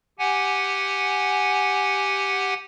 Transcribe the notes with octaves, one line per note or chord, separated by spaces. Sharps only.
G4 F#5 G#5